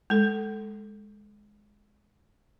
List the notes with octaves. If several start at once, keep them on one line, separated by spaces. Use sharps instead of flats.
G#3 A4